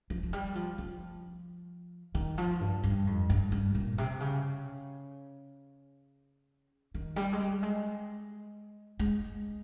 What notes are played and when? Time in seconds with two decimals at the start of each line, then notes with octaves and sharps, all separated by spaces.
0.10 F3
0.23 F3
0.33 G3
0.55 F3
0.78 F3
2.15 D#3
2.38 F3
2.61 G2
2.84 G2
3.07 F2
3.30 G2
3.52 G2
3.75 A#2
3.98 C3
4.20 C#3
6.94 D#3
7.16 G3
7.32 G#3
7.39 G3
7.62 G#3
8.99 G#3